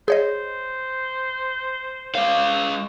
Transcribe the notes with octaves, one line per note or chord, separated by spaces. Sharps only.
G#4 C5 C#5 D#5
G#3 F5